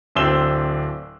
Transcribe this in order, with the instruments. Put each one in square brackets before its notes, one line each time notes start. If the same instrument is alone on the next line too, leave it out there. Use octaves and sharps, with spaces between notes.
[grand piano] D1 C4 D4 E6 E7 G7